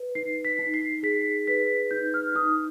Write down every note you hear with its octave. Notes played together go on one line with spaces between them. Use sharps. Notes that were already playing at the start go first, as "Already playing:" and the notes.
Already playing: B4
D#4 C7
B6
D#4
C7
G#4 B6
B4 B6
D#4 G6
F6
D#4 D#6